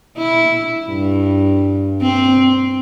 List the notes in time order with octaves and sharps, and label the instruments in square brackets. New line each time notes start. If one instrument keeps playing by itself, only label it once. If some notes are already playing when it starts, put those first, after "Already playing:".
[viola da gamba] E4
G2
C4